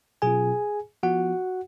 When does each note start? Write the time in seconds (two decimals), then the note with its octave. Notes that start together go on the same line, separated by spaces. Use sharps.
0.22 B2 F#3 C#4 F4 G#4 G#5
1.03 F3 B3 F4 F#4 F#5